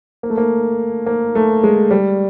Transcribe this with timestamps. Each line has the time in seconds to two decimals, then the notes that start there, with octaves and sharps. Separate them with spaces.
0.23 A#3
0.30 A3
0.37 A#3
1.06 A#3
1.35 A3
1.63 G#3
1.91 G3